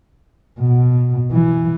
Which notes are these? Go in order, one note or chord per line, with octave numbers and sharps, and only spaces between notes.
B2
E3